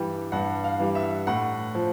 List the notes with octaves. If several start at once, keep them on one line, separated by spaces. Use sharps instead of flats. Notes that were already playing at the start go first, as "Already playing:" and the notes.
Already playing: G2 E3 G3 G5
G2 F#5
F5
E3 G3
E5
A2 F#5
F3